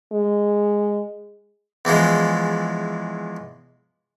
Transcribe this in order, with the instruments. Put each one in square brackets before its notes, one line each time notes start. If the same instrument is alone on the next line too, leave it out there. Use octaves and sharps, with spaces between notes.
[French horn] G#3
[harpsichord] E2 E3 F3 G#3